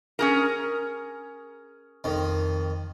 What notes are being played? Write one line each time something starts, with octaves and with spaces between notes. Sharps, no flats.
C#4 G#4 A#4
F2 D#3